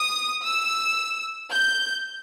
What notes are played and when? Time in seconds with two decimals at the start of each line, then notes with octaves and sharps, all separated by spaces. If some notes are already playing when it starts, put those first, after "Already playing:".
Already playing: D#6
0.44 E6
1.53 G6